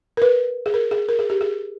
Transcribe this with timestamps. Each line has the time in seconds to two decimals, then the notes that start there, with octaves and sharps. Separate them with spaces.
0.17 A#4
0.22 B4
0.66 G#4
0.74 A#4
0.91 G#4
1.09 A#4
1.19 G#4
1.30 G4
1.41 G#4